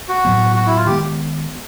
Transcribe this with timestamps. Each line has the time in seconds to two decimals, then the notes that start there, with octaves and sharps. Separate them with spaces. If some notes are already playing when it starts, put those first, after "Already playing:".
0.09 F#4
0.25 A2 F#3 B3
0.56 F#4
0.66 E4
0.76 F4
0.86 D#3 G#3 B3 G4